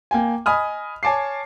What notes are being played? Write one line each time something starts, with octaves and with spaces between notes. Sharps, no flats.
A#3 G5 G#5
D#5 G#5 B5 D#6 F6
C#5 G#5 A5 D6 C7